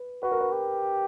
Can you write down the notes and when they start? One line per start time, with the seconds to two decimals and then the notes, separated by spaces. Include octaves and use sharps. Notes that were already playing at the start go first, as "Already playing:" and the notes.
Already playing: B4
0.23 F#4 B4
0.32 A#4
0.41 B4
0.52 G4